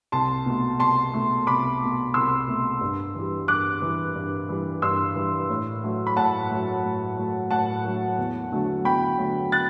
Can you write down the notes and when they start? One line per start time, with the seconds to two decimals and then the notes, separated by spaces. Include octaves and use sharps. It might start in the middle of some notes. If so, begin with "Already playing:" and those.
0.12 C2 A5 C6
0.46 B2 A3
0.80 C2 A5 C6
1.14 B2 A3
1.47 C2 B5 D6
1.81 B2 A3
2.14 C2 C6 E6
2.48 B2 A3
2.81 G2
3.15 E3 G3
3.48 G2 D6 F#6
3.82 E3 G3
4.15 G2
4.49 E3 G3
4.82 G2 C6 E6
5.16 E3 G3
5.50 A2
5.83 F#3 A3
6.07 B5
6.16 A2 F#5 A5
6.50 F#3 A3
6.84 A2
7.17 F#3 A3
7.51 A2 F#5 A5
7.85 F#3 A3
8.18 E2
8.52 D3 F#3 A3
8.85 E2 G5 B5
9.19 D3 F#3 A3
9.52 F#6 A6